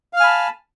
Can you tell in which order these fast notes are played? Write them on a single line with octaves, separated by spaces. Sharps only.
F5 F6 G#5 B5 A5